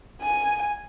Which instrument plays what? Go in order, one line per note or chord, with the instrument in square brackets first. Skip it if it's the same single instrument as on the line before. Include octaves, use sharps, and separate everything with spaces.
[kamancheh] G#5